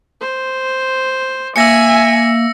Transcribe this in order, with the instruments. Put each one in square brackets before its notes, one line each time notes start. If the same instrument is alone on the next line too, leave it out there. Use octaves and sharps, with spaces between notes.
[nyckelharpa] C5
[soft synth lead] A#3 [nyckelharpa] E5 [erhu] G#5 [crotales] E6 A#6 C#7